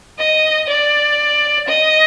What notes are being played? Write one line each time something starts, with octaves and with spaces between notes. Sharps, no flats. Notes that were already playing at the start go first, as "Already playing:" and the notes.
D#5
D5
D#5